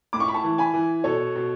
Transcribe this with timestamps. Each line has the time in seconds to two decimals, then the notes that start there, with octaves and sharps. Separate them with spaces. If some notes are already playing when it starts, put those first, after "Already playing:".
0.13 A2 D6
0.20 C#6
0.28 B5
0.34 A5 C#6
0.44 E3
0.58 G#5 B5
0.74 E3
1.04 B2 A4 C#5
1.35 B2